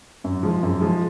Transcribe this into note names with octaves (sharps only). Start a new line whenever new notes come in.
F#2
F3 G#3
F#2
F3 G#3